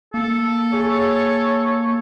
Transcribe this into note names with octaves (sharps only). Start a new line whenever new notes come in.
A#3 A4
G#4 C#5